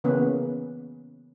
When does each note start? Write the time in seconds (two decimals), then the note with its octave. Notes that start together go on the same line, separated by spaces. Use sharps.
0.04 C#3 E3 A#3 B3 C#4 B4